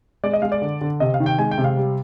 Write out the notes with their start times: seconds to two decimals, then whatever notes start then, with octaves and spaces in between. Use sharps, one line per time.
0.24 G#3 D5
0.33 D#5
0.42 G#3 F5
0.52 D5
0.62 D3
0.81 D3
1.00 C3 D#5
1.14 F5
1.20 D#3
1.26 G5
1.39 G#3 G#5
1.51 G5
1.58 C3
1.64 F5
1.77 G3